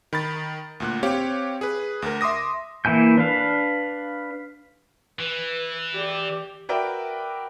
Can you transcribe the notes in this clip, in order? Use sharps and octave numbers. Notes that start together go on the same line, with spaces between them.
D#3 B5 A6
D2 A#2 F#6
C4 G4 C#5 F5
G#4 B4
D2 A#4
E5 C6 D6 D#6 A#6
E3 A#3 E4 G#5 G6
D4 B4 F5
E3 B4
G4 D5
F#4 A#4 B4 D5 E5 G5